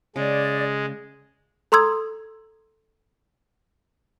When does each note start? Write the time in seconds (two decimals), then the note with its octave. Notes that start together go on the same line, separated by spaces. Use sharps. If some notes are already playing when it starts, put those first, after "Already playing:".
0.16 C#3 G#3 D5
1.72 A4 A#5 C6 D#6 E6 G#6